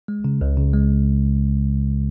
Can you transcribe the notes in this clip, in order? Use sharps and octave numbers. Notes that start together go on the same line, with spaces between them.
G#3
C#3
C#2
C#3
G#3